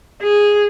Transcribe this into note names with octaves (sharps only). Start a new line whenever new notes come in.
G#4